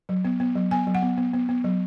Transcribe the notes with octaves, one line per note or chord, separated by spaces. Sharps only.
F#3
B3
B3
F#3
B3 G#5
F#3
F#5
B3
B3
B3
B3
F#3